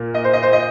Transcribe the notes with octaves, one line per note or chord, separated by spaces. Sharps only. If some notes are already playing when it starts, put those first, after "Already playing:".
Already playing: A#2 A#3
D#5
C5
D#5
C5
D#5